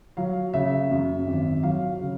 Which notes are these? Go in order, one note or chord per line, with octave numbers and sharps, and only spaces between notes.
F#3 F5
C#3 E5
F#2
G#1
F#3 F5
C#3